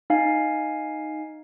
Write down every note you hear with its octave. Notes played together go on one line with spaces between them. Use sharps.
D#4 F5 G#5